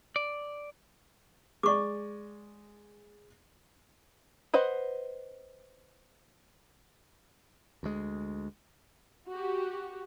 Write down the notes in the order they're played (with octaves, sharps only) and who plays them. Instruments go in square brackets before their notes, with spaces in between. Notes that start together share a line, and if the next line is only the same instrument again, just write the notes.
[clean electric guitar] D5
[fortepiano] G#3 D5 [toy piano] C#6 D6
[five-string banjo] B4 C5 D#5 F#5
[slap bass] D2 G#3
[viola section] F#4 G4